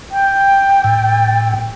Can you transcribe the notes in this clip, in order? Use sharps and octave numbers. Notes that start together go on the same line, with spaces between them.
G5
A2